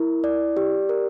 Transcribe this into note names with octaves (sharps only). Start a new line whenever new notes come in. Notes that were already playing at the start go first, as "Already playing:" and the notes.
Already playing: E4 A#4
D5
G4
A#4